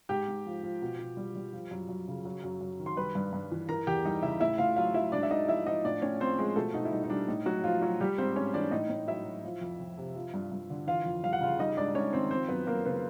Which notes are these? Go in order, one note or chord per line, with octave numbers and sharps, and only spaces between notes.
G#2 G4 G5
G#2
F3
F3
B2
B2
G3
G3
F3
F#2
F#2
C#3
F#3
F#2
F#2
D#3
C6
G3 B4 B5
G2
G2
E3
E3 A#4 A#5
E2 G4 G5
G3 D#4 D#5
C#3 E4 E5
A2 E4 E5
A2 F4 F5
F#3 F4 F5
F#3 E4 E5
G#2 D4 D5
E5
G#2 D#4 D#5
F3 E4 E5
F3 D#4 D#5
A2 D4 D5
A2 C#4 C#5
F3 C4 C5
F3 G#3 G#4
B2 A3 A4
B2 D#4
E4
G3 D#4
D#4
G3 D4
A2 D#4
A2 F#3 F#4
F3 F4
F3 F#3 F#4
G3 G4
G#2 C4 C5
G#2 C#4 C#5
E3 D4 D5
A2 D#4 D#5
A2
F#3 E4 E5
F#3
F3
F2
F2
C3
F3
G2
G2
D3
E3 F4 F5
F2
G3 F5
F#5
C#3 F4 F5
G3 D#4 D#5
G#2 D4 D5
G#2 C#4 C#5
D#3 C4 C5
F3 C4 C5
F#2 B3 B4
F#2 A#3 A#4
C#3 B3 B4